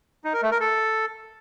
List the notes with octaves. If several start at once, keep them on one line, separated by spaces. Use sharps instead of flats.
D#4
A#4
A3
A#4
A4